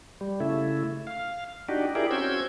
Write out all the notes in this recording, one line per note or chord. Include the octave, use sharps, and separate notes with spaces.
G3
C#3 A3 E4
F5
D4 D#4 F#4 G4
E4 G4 G#4 A#4 D5
C4 C#4 F#4 E6 G6 G#6